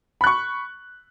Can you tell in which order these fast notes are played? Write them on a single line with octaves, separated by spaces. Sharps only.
B5 F#6 C#6